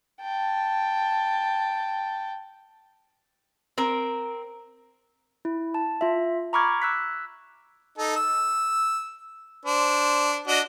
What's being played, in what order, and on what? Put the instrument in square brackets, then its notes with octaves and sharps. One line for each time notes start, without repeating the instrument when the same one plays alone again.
[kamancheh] G5 A5
[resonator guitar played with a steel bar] C4 A#4
[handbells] E4
A5
F4 E5
A#5 B5 C#6 D6 F6 G#6
E6 F#6 B6
[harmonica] D#4 A4
E6
D4 C5
D4 F#4 D#5